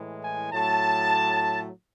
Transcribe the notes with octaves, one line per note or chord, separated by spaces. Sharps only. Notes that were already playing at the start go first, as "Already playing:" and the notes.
Already playing: A2 E3 G#3
G#5
A2 F#3 A3 A5